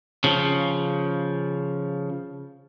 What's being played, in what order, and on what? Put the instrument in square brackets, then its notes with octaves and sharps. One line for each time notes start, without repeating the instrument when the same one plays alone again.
[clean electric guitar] C#3 F3